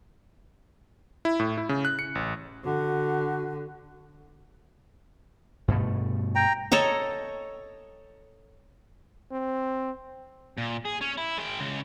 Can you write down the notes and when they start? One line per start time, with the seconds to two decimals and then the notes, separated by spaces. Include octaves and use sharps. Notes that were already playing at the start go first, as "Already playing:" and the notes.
1.25 E4
1.40 A2
1.58 E4
1.69 C#3
1.85 F#6
1.99 C#7
2.15 A1
2.64 D3 F#4
5.68 G2 B2 A3
6.35 G5 A#5
6.72 A4 C#5 D#5 A#5
9.32 C4
10.58 A#2
10.85 G#4
11.01 C#4
11.18 E4
11.38 G#3 G5
11.60 C#3 G#3